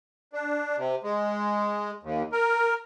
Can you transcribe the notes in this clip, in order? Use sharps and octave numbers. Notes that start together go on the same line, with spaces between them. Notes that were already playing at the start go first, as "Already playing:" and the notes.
D4
C3
G#3
D#2
A#4